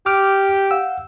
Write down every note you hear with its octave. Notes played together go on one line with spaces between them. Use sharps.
G4 D6 F6
F5 F#5 E6